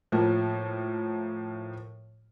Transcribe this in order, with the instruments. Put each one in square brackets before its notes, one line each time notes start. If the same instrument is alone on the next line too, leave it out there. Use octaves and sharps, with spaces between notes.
[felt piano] A2 F3 A#3